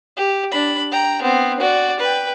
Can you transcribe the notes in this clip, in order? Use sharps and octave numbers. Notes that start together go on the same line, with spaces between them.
G4
D4 B5
G5 A#5
B3 C4
F#4 D5
B4 G5